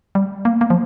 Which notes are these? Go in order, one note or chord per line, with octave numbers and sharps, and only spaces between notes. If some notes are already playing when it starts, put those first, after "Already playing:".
G3
A#3
A#3
F3